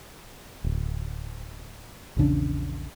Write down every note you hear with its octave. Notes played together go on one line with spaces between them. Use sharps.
D1
A#1 E2 C#3 D4